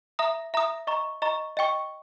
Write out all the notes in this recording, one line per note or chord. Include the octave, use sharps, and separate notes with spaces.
E5 A#5 D#6
E5 A#5 D#6
D#5 A#5 C#6
D#5 A#5 C#6
D#5 G5 C#6